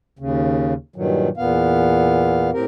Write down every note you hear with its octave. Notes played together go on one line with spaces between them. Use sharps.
D#2 C#3
G2 A#2 D#3 F#3
E2 A#2 B3 F5
A2 C4 G4 A#4